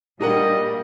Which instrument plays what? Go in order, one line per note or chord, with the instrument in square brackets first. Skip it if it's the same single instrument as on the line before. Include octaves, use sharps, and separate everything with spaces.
[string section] A#2 G3 [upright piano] A#3 D4 [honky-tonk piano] G4 A#4 F#5 [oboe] D#5